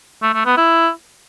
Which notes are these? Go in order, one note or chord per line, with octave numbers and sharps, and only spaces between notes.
A3
A3
B3
E4